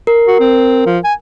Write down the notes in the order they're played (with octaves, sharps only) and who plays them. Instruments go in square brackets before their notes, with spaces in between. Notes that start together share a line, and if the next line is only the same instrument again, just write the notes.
[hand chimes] A#4
[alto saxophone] F#4
C4
F3
G#5